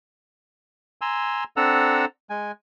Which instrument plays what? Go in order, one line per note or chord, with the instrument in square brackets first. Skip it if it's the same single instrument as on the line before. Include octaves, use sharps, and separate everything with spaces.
[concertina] G#5 A#5 C6 E6
C4 D4 A4 F#5 A#5 E6
G#3 G#5